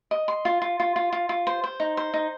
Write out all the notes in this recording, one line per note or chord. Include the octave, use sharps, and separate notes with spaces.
D#5
C6
F4
F4
F4
F4
F4
F4
C5
C5
D#4
C5
D#4